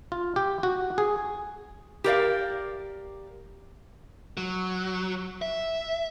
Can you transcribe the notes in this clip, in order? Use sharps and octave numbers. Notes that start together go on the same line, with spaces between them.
F4
G4
F#4
G#4
G4 A#4 D5 F5
F#3
E5